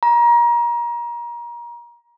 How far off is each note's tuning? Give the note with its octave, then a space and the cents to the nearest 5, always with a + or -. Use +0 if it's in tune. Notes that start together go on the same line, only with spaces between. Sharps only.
A#5 +30